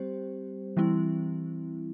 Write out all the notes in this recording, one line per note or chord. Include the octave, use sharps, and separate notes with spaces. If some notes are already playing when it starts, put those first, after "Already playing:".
Already playing: G3 C4 G4 C5
E3 G3 C4 E4